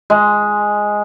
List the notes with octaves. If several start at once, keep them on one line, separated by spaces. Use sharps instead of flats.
G#3